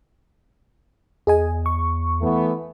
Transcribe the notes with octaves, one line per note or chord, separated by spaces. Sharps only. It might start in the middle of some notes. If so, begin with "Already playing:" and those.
E2 G#4 D#5 G#5
C#6
E3 A3 B3